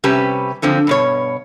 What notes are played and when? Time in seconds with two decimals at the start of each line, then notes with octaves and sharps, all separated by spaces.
0.04 C3 G3 C#4 G4 B4 A5
0.62 F#2 D3 F3 C4
0.87 G2 B2 C#5